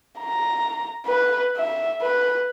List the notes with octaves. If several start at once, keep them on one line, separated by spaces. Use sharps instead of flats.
A#5
B4
E5
B4